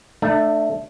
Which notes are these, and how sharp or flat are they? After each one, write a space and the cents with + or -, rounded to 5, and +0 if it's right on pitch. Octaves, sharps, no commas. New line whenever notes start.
A3 +0 D4 +30